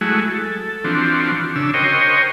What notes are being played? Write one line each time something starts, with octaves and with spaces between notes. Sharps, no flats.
F#3 G#3 A3 E4 F#4 G#4
A4
E3 F3 C4 D4 F#4
C#3 D4 E6
F#4 A#4 C5 C#5 D#5 G5